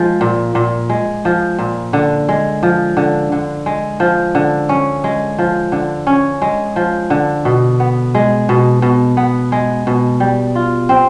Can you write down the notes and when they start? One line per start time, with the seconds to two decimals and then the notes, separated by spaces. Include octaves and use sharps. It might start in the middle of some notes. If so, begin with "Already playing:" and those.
Already playing: F3 G#3
0.21 A#2
0.55 A#2
0.89 G#3
1.25 F3
1.59 A#2
1.93 D3
2.29 G#3
2.63 F3
2.97 D3
3.32 D3
3.66 G#3
4.00 F3
4.35 D3
4.69 C#4
5.04 G#3
5.38 F3
5.72 D3
6.07 C#4
6.42 G#3
6.76 F3
7.10 D3
7.45 B2
7.80 B3
8.15 G#3
8.49 B2
8.82 B2
9.17 B3
9.52 G#3
9.87 B2
10.20 G3
10.55 F4
10.89 C4